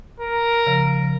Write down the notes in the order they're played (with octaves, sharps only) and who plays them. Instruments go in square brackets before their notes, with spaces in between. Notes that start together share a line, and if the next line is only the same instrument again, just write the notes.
[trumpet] A#4
[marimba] C#3 F3